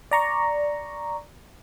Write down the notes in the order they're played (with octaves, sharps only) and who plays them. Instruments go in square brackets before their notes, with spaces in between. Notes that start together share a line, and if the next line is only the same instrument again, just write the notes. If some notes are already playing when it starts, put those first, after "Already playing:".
[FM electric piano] D5 A#5 C#6